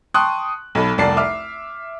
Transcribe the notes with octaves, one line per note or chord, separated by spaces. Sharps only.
G5 A5 C6 C#6 D#6 F#6
B1 A4 B5
F1 C2 D5 A5 C7
E5 D6 F6